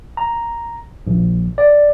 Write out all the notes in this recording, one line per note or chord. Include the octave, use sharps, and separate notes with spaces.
A#5
A#1
D5